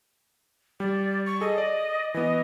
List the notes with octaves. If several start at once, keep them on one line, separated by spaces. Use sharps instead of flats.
G3 D5
C#6
G#4 A4 D#5
D5
E3 B3 D#5